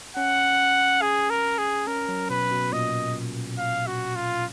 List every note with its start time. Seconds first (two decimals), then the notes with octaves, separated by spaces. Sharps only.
0.17 C#4 F#5
1.02 G#4
1.30 A#4
1.58 G#4
1.87 C#4 A#4
2.08 F#3
2.30 B2 B4
2.51 B2
2.72 A#2 D#5
3.58 F5
3.87 F#4
4.16 F4